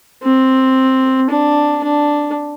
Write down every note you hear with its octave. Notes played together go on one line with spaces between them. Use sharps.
C4
D4
D4